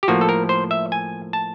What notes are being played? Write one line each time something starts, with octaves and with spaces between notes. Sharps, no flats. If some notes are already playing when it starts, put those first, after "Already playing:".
G4
A2 F3 A#3 F#4
A4
A#4
C5
E5
G#5
A5